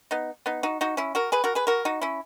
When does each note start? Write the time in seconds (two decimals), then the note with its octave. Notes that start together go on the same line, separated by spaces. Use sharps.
0.11 B3 D#4
0.46 B3 D#4
0.63 D#4 F#4
0.81 D#4 F#4
0.97 C#4 E4
1.15 F#4 A#4
1.32 G#4 B4
1.44 F#4 A#4
1.55 G#4 B4
1.67 F#4 A#4
1.85 D#4 F#4
2.01 C#4 E4